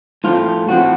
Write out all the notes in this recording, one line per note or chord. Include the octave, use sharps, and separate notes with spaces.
A2 F3 A3 C4 F4
A2 F3 A3 C4 F#4